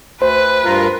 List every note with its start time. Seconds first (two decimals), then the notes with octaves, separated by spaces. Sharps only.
0.22 D2 B4 C5
0.65 G2 F4 A#4